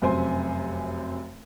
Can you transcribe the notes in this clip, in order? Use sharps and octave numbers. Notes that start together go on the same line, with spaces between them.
F1 F#2 C3 C5 G#5 C6